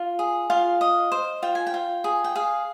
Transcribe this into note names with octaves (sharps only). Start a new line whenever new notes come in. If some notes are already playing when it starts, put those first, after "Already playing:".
Already playing: F4
G#4
F4 F5
D#5
C5
F4 G5
G#5
G5
F4
G#4
G5
G#4 F5